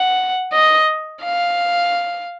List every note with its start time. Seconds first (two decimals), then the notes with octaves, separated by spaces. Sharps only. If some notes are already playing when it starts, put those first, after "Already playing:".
Already playing: F#5
0.53 D#5
1.24 F5